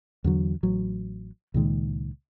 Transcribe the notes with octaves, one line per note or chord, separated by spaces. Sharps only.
E2 D3 F#3
A1 F#3
C#2 A#2 D#3 G#3